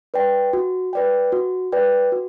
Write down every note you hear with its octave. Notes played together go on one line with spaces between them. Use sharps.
B4 D5 G5
F#4
B4 D5 G5
F#4
B4 D5 G5
F#4